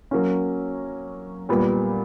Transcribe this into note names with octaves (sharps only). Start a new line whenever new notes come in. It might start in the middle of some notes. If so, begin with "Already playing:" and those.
F#3 A#3 C#4
A#2 G3 B3